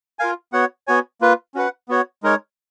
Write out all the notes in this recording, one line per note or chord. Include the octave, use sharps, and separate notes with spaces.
F4 A#4 F5 G#5
B3 F#4 C#5 F#5
B3 F#4 C#5 G#5
A#3 F4 B4
C#4 F#4 B4 F#5
B3 F#4 C#5
G#3 D#4 A#4 C#5